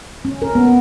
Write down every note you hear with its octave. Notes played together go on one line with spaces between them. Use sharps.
C#4
A#4
B3